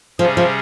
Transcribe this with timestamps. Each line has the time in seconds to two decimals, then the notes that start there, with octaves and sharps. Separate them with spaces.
0.19 C3 F3 G3 C#4 G#4
0.37 F3